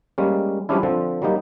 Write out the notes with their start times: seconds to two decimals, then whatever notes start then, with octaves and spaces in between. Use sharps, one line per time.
0.18 G3 G#3 A#3 C#4
0.69 F3 G3 G#3 C#4 D4 E4
0.83 D3 F3 C4
1.22 F#3 G3 A#3 D#4